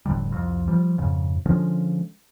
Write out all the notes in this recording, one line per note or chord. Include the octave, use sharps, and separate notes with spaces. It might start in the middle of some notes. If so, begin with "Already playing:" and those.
F1 A2 D3 G3
C2 F2
F3 G3
F2 G#2 C#3
D3 F3 G#3 C#4